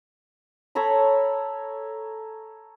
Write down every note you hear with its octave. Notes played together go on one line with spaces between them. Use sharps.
A4 C#5 A#5 B5